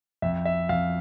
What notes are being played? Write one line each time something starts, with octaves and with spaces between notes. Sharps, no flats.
F2 E5
E5
F2 F5